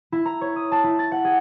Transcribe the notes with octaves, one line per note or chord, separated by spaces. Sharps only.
E4
A#5
C#5
D#6
A5
E4
A6
F#5
G#4